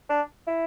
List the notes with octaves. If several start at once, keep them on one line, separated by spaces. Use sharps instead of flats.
D4
E4